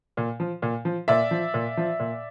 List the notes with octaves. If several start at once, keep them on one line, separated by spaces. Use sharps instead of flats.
A#2
F3
A#2
F3
A#2 D5 E5
F3
A#2
F3
A#2